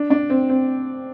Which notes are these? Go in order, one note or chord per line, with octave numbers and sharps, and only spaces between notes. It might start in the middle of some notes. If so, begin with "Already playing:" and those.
Already playing: D4
D4
C4
C4